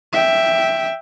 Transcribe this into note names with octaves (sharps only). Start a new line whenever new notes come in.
E5 G5